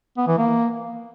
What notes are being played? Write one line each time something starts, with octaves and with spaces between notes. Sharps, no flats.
B3
E3
A#3